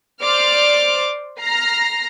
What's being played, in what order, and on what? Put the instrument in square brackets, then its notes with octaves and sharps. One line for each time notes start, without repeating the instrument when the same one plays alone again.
[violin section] C5 D5 C6 D6 F6
A#5 F6 A#6 C7